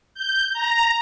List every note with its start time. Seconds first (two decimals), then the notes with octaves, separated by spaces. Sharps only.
0.15 G6
0.53 A#5